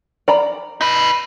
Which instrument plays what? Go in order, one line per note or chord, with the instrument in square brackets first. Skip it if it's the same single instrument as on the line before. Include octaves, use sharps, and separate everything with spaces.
[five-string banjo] D5 A#5 B5
[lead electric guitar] D#4 B4